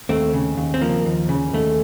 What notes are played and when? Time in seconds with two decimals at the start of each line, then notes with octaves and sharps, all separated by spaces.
0.09 D#2 A3 C4
0.33 C#3
0.57 D#2
0.74 C4
0.82 F3 A#3
1.05 D#2
1.29 C#3
1.53 D#2 A3